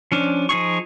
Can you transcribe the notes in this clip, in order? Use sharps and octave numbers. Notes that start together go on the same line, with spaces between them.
F3 C#4 D4
F3 D#4 G#4 C#6